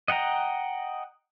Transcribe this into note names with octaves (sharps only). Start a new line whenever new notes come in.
D#5 F#5 G5 A#5